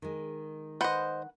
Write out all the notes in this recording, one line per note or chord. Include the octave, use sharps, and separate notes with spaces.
D#3 G#3
B4 C5 D#5 F#5